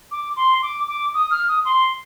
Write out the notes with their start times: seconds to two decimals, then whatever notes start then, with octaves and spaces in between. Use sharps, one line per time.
0.11 D6
0.36 C6
0.62 D6
0.88 D6
1.14 D#6
1.31 F6
1.48 D#6
1.65 C6